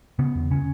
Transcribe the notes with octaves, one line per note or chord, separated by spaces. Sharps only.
C#3 B3
E2
C#3 C#4